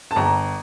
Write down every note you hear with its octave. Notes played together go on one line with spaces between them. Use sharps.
A5
G1 A#5